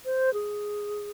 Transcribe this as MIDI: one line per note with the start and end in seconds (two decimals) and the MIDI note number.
0.05 0.33 72
0.34 1.10 68